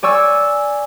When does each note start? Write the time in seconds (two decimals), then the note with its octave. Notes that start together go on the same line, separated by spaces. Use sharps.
0.03 D5 G#5 C#6 E6